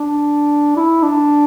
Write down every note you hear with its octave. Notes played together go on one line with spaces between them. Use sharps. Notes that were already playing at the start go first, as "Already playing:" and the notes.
Already playing: D4
E4
D4